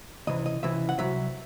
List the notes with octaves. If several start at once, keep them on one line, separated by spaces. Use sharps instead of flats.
C#2 C3 E3 D#5
D#5
C#2 C3 E3 E5
F#5
C2 C3 F#3 E5